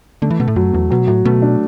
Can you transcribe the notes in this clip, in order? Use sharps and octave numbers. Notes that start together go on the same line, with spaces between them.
D3 A3
E3
B2 A3
A2
F#2 F#3
E2 A3
B2 F#3
A2 F#3
B2 A3
D4